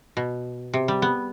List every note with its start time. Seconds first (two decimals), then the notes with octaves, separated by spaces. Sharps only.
0.17 B2
0.74 C3
0.88 G3
1.02 B3